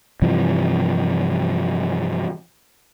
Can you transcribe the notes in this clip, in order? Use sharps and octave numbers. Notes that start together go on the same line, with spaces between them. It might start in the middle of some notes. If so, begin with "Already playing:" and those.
G2 C3 E3 F3